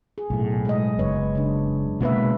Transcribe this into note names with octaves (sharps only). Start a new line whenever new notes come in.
G#4
B1 A2
G#3 B3 D#5
F#1 B4 C#5
C#3 D4
B2 G#3 A#3 F#4 B4 E5